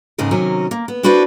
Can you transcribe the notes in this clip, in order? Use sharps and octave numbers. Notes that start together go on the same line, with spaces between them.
D#2 G#2 C#3 D#4 A#4
C3 D#3 F#3 C#4 A#4
A#3
B3
D4 E4 F#4 B4 C5 D5